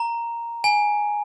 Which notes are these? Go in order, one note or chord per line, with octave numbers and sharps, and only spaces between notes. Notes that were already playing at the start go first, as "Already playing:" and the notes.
Already playing: A#5
G#5